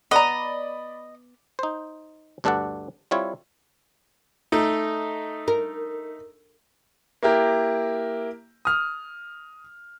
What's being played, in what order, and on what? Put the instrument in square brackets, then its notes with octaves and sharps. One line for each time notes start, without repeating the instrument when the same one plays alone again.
[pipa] B3 A#5 [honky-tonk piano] D5 B5 [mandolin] D#5
[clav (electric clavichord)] D#4 C5
D2 G2 D4 A4 D5 F#5
G3 C4 E4 F4 C#5
[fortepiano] A3 D#4
[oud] A#4
[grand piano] A#3 E4 G4 A#4
D#6 F6